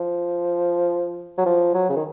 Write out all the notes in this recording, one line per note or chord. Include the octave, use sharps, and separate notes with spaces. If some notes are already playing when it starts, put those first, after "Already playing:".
Already playing: F3
F#3
F3
F#3
C#3
D#3